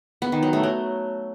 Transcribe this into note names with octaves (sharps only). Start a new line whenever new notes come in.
B3
D#3
F#3
A3
F#3